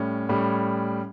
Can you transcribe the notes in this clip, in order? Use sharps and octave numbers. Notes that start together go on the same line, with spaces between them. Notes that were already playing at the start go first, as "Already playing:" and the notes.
Already playing: A2 G3 C#4
A2 G3 C#4